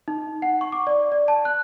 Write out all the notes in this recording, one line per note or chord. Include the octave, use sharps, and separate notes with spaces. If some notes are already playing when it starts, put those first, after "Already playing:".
D#4
F#5
C#6
D6
D5
D5
A5
F#6